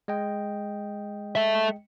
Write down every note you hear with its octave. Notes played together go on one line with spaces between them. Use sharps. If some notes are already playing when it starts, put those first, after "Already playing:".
G#3 D#5 G5
A4 E5